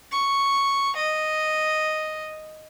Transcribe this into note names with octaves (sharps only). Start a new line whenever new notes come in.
C#6
D#5